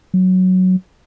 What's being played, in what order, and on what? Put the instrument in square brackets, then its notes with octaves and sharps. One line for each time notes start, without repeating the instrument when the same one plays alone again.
[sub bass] F#3